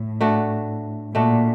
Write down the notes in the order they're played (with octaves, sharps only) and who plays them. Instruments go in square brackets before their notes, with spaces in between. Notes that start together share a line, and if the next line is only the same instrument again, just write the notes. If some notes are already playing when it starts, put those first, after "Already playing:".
Already playing: [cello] A2
[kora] A3 D4 F#4
[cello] A#2 [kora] A3 D4 F#4